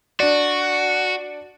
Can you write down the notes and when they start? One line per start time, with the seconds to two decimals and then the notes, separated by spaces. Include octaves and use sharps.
0.20 D4 F#4 D5